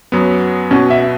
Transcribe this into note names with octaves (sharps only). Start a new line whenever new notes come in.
F#2 F#3 B3
B2 B3 C#4 F#4
E5